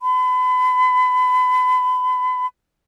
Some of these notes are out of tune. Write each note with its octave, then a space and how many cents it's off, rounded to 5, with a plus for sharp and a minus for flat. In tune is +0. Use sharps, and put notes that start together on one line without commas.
B5 +35